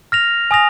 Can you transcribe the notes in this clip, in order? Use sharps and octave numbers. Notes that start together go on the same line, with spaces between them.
F6 A#6 F7
G#5 D#6 A#6 F7